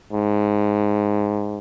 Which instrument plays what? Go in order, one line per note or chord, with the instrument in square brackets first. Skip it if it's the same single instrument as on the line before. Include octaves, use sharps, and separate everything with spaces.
[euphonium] G#2